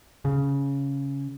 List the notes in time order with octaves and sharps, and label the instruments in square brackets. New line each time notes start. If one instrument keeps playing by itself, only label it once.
[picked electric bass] C#3